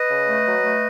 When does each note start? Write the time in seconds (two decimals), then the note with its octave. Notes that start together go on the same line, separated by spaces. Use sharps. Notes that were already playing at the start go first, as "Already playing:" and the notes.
Already playing: B4 D#5
0.09 C#3
0.28 A3
0.46 F#3
0.63 A3